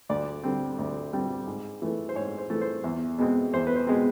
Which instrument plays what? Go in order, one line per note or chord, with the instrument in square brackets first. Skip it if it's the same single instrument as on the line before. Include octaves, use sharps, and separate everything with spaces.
[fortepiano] D2 D5
D3 G3 C4
D2
D3 G3 C4
G#2
E3 A3
C5
G#2 C#5
C5
E3 A3
C5
E2
B2 G#3 C4
E2 C5
B4
C5
B2 G#3 C4